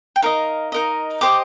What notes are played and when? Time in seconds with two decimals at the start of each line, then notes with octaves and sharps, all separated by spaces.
0.16 G5
0.22 D#4 A#4 D#5 F5
0.72 D#4 A#4 D#5
1.21 G4 C5 D#5 D6